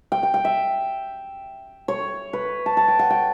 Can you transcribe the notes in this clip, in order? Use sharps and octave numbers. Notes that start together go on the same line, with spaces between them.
G5
G5
G5
E5
C#5
B4
A5
A5
G5
F#5
G5